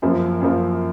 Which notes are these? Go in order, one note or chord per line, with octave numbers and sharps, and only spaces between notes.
F#2 F3 A#3
F#2 F3 A#3